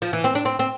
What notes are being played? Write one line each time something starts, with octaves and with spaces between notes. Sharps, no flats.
F3
E3
C4
D4
C4
C4